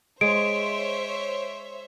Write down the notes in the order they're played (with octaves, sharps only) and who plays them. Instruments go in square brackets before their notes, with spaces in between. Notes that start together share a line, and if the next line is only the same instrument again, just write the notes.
[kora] G#3 [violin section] C5 C#5 E5 [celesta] D7